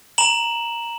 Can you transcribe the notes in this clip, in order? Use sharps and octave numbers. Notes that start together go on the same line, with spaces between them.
A#5 E7 F#7